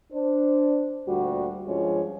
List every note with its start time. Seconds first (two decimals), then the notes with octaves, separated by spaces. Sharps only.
0.12 D4 C5
1.07 D2 A#2 G3 F#4
1.67 G2 F3 G#3 C#4 F4 C#5